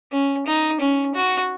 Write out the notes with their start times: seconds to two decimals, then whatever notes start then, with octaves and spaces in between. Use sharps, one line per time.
0.12 C#4
0.47 D#4
0.81 C#4
1.15 F#4